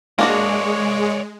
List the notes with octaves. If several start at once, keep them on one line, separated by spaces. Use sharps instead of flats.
G#3 A#3 D4 F#4 C#5 D5